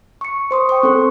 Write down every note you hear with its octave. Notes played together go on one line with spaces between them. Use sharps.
C#6 C#7
C5 C6 D#6
G5 C#6
C4 A4 C6